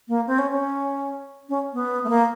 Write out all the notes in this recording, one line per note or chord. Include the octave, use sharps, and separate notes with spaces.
A#3
C4
C#4
C#4
C#4
B3
A3
A#3